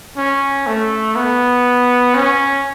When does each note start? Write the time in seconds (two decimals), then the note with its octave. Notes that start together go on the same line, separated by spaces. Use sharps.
0.17 C#4
0.67 A3
1.16 B3
2.14 C#4